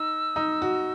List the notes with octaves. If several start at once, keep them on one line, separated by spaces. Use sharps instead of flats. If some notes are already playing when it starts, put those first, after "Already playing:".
Already playing: D#4 E6
D#4
F#4